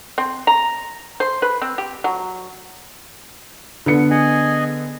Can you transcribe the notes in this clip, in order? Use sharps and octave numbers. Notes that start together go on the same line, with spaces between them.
C4
A#5
C5
B4
C4
G4
F#3
D3 B3 C#7
G#4 D#5 G#5